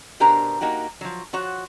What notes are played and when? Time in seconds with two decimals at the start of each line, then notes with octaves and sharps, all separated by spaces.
0.20 B2 D4 G4 A#4 C5 A#5
0.61 A#3 D#4 F#4 G4
1.01 F3 F#3
1.33 F3 F#4 C#5 F#5